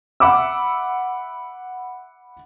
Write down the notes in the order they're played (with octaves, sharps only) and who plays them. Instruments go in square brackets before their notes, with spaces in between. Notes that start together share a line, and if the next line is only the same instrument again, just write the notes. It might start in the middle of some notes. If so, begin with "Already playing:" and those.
[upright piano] E5 F#5 B5 D6 E6